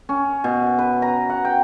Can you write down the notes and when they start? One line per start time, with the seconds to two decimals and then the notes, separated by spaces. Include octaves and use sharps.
0.09 C#4
0.44 B2
0.79 B4
1.02 A#5
1.30 F#5
1.45 G5